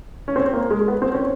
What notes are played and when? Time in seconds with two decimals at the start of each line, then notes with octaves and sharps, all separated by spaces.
0.28 C#4
0.36 C4
0.53 A#3
0.71 G#3
0.88 B3
1.02 C4
1.14 C#4